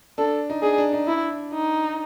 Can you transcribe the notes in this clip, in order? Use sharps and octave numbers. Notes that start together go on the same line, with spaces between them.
D4 A4
D#4
D4 G#4
D4
D#4
D4 E4
D#4